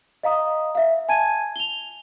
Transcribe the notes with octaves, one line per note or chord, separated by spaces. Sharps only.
D#5 F5 A#5 D#6
E5 F5
G#5 A5 G#6 D#7
F7 G7